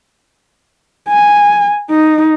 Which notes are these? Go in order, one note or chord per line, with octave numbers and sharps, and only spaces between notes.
G#5
D#4